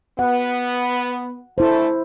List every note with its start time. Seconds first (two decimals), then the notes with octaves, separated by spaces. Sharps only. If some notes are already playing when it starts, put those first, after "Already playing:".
0.19 B3 F#5
1.58 D3 E3 A3 E4 C5